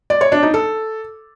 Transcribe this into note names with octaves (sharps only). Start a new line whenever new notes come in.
D5
C#5
D4
D#4
A4